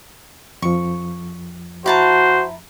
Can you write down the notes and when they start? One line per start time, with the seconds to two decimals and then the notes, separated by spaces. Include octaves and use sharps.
0.62 F2 F3 C#6
1.86 E4 F#4 C5 A5 A#5